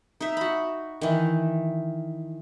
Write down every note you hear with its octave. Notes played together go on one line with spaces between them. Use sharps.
D#4 E5
F#4 B5
D#3 E3